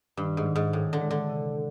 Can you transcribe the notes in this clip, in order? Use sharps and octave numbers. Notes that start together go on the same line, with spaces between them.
G2 D#3
G#2
D#3
G#2
A2 D#3
D3
G#3
D3
C3